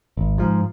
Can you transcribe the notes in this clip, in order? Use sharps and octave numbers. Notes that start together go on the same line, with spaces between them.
G#1
G#2 F3